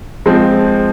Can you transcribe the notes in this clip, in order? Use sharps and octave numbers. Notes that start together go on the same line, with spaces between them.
F3 G#3 C4